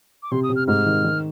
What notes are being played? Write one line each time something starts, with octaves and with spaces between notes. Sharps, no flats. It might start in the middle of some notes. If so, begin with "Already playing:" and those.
D6
C3 C6
D#6
C3
F6
G#2 F6
D#3
D#3